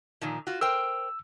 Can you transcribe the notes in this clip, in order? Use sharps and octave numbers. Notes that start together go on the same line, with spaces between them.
A#2 D#3 F3
F4 F#4
A#4 C5 G5 E6